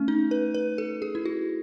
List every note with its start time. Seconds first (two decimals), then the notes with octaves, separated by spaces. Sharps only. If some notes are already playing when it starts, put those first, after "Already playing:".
Already playing: A3 C#4
0.08 D#4
0.31 B4
0.54 B4
0.78 A4
1.02 G#4
1.15 E4
1.25 F#4